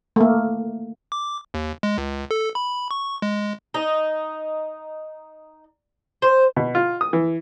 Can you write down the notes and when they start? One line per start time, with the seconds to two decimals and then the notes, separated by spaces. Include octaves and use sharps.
0.16 A3 A#3
1.12 D6
1.54 D#2
1.83 G#3
1.98 C#2
2.31 A4
2.55 B5
2.91 C#6
3.22 G#3
3.74 D#4
6.22 C5
6.56 B2
6.75 F4
7.01 D#6
7.13 E3